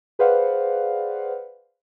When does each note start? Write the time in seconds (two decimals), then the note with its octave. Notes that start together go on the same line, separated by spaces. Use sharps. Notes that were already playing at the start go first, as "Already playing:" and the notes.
0.19 G#4 B4 C5 D5 F5 F#5